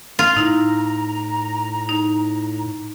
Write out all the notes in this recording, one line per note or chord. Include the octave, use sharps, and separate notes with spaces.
F4
A2 D#4 E4 A#5
D#4